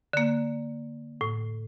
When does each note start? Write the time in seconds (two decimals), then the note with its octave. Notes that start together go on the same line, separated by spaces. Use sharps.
0.13 D3 A#3
1.21 A2